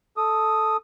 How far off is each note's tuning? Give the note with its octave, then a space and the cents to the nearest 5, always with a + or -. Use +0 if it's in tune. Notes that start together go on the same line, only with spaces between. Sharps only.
A4 +0 D#6 +0